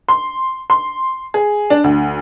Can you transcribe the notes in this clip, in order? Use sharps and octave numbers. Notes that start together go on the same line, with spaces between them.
C6
C6
G#4
D4
D2